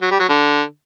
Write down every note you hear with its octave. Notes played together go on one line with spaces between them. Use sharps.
F#3
G3
F#3
D3